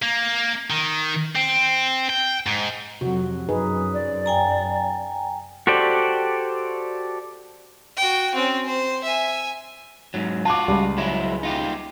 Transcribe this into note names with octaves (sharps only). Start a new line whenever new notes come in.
A#3
D#3
C4
G5
G#2
F2 C3 F#3 F#4
F#2 D#4 G#4 B4
D5
G5 G#5 A#5
F#4 G4 A4 C5 D5
F#4 G5
C4 C#4
C5
E5 G#5
G#2 F#3
F4 F#4 A5 D6
C#2 G3
F#3 G#3 E4
D#4 F4 G4